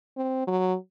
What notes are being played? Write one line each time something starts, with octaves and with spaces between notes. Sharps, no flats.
C4
F#3